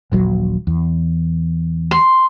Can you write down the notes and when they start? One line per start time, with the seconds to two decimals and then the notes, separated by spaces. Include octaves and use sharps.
0.12 D#1 A#1 F#3
0.67 E2
1.91 C6